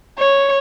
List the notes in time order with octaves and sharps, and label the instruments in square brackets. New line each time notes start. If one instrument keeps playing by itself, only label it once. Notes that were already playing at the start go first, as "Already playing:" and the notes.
[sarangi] C#5